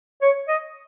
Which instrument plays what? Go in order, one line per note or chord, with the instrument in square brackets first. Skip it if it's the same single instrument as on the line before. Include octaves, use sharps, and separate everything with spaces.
[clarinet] C#5
D#5